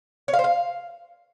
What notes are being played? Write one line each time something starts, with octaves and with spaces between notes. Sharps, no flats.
C#5
F5
C5
F5